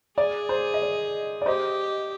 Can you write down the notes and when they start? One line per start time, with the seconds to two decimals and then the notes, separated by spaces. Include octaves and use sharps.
0.17 G#4 D5
0.49 C5
0.74 D#5
0.82 D5
1.42 D5
1.46 G4 C5 D#5